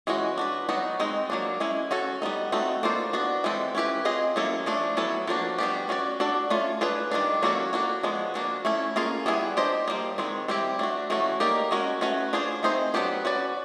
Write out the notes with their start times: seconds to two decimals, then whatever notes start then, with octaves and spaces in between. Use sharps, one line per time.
0.07 E3 G#3 C#4 F#4
0.37 D4 F#4 B4
0.69 F#3 B3 D#4 F#4
1.00 G#3 C4 D#4
1.30 F#3 A#3 D4
1.60 G#3 C#4 E4
1.91 C#4 F#4 A4
2.22 G3 B3 D#4
2.52 A3 C4 D#4 F#4 A4
2.83 A#3 D4 F4 A4 C5
3.13 B3 D4 F#4
3.44 E3 G#3 C4 E4 A4
3.75 C#4 E4 G4 B4
4.05 C4 F4 G#4 C5 D#5
4.36 F#3 A#3 C#4 E4 A4
4.66 F3 A3 D4
4.97 F#3 B3 E4 A4 C#5
5.27 F3 A#3 D4 F#4
5.58 G3 B3 D4 G4
5.89 C#4 F#4 B4 D5
6.20 D4 F#4 A4 D5
6.50 A3 C#4 F4
6.81 D4 F4 G#4 B4
7.11 D#3 G3 A#3 D4
7.42 F#3 A#3 C#4 F#4 A4
7.73 A#3 D4 F#4
8.03 F3 G#3 B3
8.34 F3 A#3 D4 F#4
8.65 A3 C#4 E4
8.96 A#3 C#4 F4 G#4
9.26 G3 B3 E4 G#4
9.57 D4 G4 C5 D#5
9.88 G3 A#3 D#4
10.18 D#3 G#3 C4
10.48 G3 C4 E4 G4
10.79 A3 D4 F#4
11.10 E3 A3 C#4 F#4
11.40 A#3 D#4 G4 A#4 D5
11.71 G#3 C#4 F#4 A#4
12.01 A3 C#4 F#4 B4
12.33 D4 F4 G#4 C5
12.63 A3 C4 D#4 G#4 C5
12.94 F#3 B3 D4 G4 B4
13.25 C#4 F#4 B4 D5